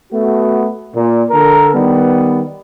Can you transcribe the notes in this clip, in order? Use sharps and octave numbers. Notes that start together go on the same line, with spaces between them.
A3 B3 F#4
A#2
D3 A4 A#4
D#3 G3 B3